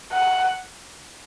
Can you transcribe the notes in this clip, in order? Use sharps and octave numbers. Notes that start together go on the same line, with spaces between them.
F#5